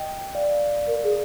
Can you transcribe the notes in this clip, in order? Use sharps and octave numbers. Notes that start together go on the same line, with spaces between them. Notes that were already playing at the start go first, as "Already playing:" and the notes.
Already playing: D#5 G5
D5 F5
A#4
G#4